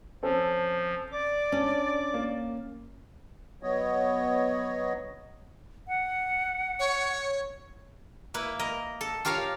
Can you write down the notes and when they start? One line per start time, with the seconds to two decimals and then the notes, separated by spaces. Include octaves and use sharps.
0.23 F3 C4 C#4 A4
1.12 D5 D6
1.52 C#4 D4
2.14 A#3
3.63 F#3 B3 C#5 D#5
5.88 F#5
6.79 C#5
8.34 A#3 E4 B4
8.59 A#4 D#5
9.01 A4
9.25 F4 G4 A#4 C#5 F5